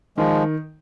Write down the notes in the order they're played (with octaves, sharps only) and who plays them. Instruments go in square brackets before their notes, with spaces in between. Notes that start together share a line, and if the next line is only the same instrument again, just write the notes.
[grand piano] D#3 [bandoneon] F3 G#3